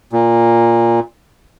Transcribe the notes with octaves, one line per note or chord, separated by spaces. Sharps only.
A#2